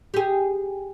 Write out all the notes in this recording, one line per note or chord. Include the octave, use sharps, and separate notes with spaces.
G4 G#4